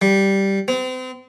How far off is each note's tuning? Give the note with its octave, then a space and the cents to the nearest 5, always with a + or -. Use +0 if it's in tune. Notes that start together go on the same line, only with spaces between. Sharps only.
G3 -5
C4 -35